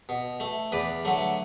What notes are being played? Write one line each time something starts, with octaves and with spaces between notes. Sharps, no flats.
B2
A3
E2 B4 D5
D3 F#3 A3